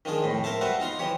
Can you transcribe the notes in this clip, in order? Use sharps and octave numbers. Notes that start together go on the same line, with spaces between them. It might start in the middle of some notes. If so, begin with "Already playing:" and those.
D#3 F3 D4 G#4
F2 A2
A#4 C5 E5 A5
G3 F#4 B4 E5 F5
D#4 F4 A#5 C6
E3 F3 G4 C#5